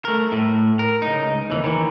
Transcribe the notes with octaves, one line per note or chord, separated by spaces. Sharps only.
A3 A#4
A2
A#4
C#2 D#4
D#2 E3
D#3 E3